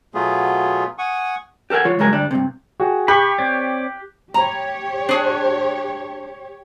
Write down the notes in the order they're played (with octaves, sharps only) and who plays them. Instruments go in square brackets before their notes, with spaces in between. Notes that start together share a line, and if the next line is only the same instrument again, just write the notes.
[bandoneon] B2 F#3 A3 B3 F4 G#4
F#5 G#5 C#6 D#6
[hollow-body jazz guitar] G4 A4 A#4 F#5 G#5
F3 F4 C#5
C#2 G2 F#3 G#3 A#4 G#5
D2 G2 G3 D4
G2 C3
[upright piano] F#4 G#4 G5
[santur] G4 [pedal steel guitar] B5 C#6 [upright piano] F#6 B6 F#7
[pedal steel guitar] C4 C#5 D5
[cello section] G4 C#5 [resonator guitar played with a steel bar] A#5
[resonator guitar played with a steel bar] D4 G#4